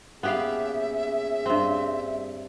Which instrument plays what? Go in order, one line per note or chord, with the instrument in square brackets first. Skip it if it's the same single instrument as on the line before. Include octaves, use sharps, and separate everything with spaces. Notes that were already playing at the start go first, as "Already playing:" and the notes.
[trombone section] A#2 C#4 G#4 [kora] B3 G4 F5 [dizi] E5
[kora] G2 C4